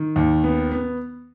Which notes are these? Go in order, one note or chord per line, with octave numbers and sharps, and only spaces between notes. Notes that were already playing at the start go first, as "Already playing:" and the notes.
Already playing: D#3
D#2
B3
B3